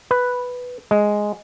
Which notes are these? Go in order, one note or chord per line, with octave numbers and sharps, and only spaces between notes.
B4
G#3